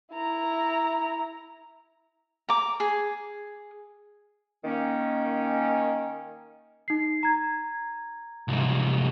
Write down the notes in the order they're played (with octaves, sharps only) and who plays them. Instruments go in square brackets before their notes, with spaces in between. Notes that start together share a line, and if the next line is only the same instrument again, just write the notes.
[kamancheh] E4 A#5
[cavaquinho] A#5 D6
G#4
[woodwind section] D#3 A#3 C#4
[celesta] D#4 C7
A#5 G#6
[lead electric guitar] C2 G#2